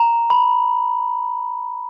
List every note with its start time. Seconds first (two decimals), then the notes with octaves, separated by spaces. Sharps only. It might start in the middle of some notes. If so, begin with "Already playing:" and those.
Already playing: A#5
0.30 B5